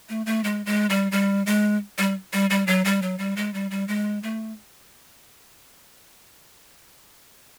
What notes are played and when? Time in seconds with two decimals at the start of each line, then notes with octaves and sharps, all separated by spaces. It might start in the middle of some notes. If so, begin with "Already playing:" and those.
0.09 A3
0.26 A3
0.44 G#3
0.66 G#3
0.90 G3
1.12 G3
1.46 G#3
1.98 G3
2.33 G3
2.50 G3
2.67 F#3
2.85 G3
3.02 F#3
3.18 G3
3.36 G#3
3.54 G3
3.71 G3
3.88 G#3
4.23 A3